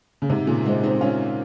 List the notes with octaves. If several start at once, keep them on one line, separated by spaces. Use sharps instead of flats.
C#3
G#2 C3
A#2 C#3
G#3 C4
C4 D#4
C#4 F4